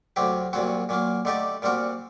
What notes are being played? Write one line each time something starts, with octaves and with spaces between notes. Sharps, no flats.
D2 C3 F#3 C4 G4
C2 A#2 F#3 C4 F#4
A#2 F#3 A#3
D3 A3 D#4 G4 D5
A#2 G3 C4 F#4 A#4